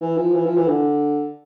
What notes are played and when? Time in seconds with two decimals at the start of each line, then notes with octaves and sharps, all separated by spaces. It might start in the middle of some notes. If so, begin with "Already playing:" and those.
0.01 E3
0.17 F3
0.34 E3
0.46 F3
0.57 E3
0.68 D3